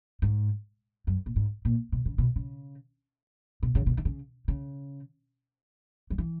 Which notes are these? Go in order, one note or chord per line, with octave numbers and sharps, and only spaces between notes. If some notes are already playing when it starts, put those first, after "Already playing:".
G#2
F#2
A#2
G#2
A#2
B2
C#3
B2
C#3
B2
C#3
B2
D#3
C#3
C#3
F#3
E3